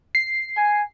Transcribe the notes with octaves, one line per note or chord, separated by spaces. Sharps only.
C7
G#5